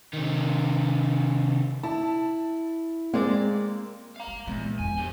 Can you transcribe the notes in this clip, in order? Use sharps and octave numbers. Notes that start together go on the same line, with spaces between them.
C3 D#3
E4 A5
G#3 A#3 C4 D5
F5 A#5
G3
E2 A#2 G#3
G1 F2 G#5
D3 G4